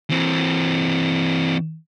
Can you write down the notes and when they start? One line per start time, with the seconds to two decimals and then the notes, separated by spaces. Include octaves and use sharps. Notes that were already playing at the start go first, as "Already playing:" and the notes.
0.10 E3 C4